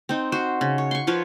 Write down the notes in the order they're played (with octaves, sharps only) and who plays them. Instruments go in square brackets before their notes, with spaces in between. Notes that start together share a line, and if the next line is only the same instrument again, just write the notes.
[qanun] C4 D#4
F#4 C5
C#3
C#5
C6 C#6
F3 F4 B4 C#5